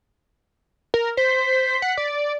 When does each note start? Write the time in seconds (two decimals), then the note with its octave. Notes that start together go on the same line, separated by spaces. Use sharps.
0.94 A#4
1.17 C5 B6
1.82 F#5
1.97 D5